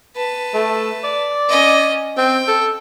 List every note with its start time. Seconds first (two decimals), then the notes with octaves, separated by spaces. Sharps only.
0.16 B4 A5
0.54 A3
1.04 D5
1.49 C#4 D#5
2.18 C4 G5
2.48 A4